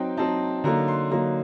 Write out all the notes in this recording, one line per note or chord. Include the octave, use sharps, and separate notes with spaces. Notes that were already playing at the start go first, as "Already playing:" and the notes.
Already playing: F#3 C4 D#4 G5
F#3 C4 D#4 A5
D3 F#3 A#3 D#4 A#5
C6
D3 F#3 A#3 D#4 A#5